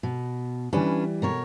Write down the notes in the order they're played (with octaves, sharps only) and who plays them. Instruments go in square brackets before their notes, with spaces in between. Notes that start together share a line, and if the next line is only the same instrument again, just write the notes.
[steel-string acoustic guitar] B2
[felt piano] E3 G3 [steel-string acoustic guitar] C#4 D4 B4
[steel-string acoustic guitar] B2 A#4 C#5